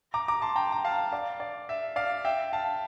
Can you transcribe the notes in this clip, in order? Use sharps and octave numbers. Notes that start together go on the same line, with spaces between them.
A#5 D6
A#5 D6
A5 C6
G5 A#5
A#5
F5 A5
D5 F5
D5
E5
D5 F5
E5 G5
F5 A5